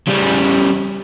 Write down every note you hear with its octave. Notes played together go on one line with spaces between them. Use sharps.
C#3 G3